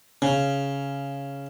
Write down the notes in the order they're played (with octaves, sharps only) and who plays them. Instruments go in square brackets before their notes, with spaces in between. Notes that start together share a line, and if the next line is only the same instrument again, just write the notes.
[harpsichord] C#3